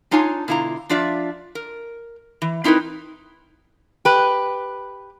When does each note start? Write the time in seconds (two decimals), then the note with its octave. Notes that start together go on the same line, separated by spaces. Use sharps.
0.11 D4 D#4 F4 C#5 G#5 A5
0.48 B2 D3 E4 F4 A#5
0.89 F3 D4 F4 D5 E5
1.55 A#4
2.42 E3
2.64 C4 D#4 E4 A#4 B4
4.05 G4 B4